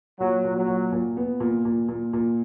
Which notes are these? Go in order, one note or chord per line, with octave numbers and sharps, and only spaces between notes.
A#2 F#3
A#2
F#3
A#2
A#2
B3
A#2
A#2
A#2
A#2